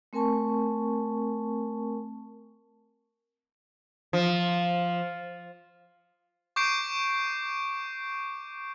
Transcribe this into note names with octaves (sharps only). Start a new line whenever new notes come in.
A3 C4 A#4 G#5 A5 C#6
F3
C#6 D6 G6 C7 D7